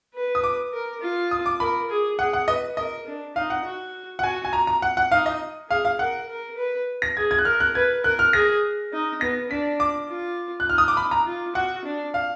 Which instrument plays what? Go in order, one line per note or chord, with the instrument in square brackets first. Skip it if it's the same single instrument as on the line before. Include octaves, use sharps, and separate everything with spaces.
[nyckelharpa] B4
[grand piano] D#6
D6
[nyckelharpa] A#4
F4
[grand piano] D#6
D6
[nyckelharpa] A#4 [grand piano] B5
[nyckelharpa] G#4
[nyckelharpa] G#4 [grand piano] F#5
[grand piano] F#5
[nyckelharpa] B4 [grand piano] D#5
[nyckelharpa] A#4 [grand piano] D#5
[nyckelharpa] D4
[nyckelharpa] D#4 [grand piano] F5
[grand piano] F#5
[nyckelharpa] F#4
[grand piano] F#5
[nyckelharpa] F#4 [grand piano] G#5
[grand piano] G#5
A#5
A#5
F#5
F#5
[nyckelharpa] D#4 [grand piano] F5
[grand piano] D#5
[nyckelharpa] G#4 [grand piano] F5
[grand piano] F5
[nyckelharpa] A#4 [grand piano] F#5
[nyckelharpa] A#4
B4
[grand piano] A#6
[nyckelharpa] G#4 [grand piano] G#6
[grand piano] G#6
F#6
[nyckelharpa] A#4 [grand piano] F6
[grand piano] F#6
[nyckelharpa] B4 [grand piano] G#6
[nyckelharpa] A#4 [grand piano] F#6
[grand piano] F6
[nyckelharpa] G#4 [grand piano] A#6
[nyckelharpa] D#4
[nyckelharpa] B3 [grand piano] A#6
[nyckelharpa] D4 [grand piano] B6
[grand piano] D6
[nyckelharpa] F4
[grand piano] F#6
[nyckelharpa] D#4 [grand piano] F6
[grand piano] D#6
D6
B5
A#5
[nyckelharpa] F4
[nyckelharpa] F#4 [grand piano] F#5
[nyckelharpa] D4
[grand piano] F5